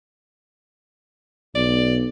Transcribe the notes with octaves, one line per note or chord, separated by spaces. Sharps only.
B1 D5